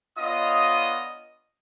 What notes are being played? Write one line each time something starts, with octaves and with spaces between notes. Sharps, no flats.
B3 D4 F4 C#5 D#5 D#6